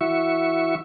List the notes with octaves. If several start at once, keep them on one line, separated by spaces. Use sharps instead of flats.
E3 E4 F#4 E5 C#6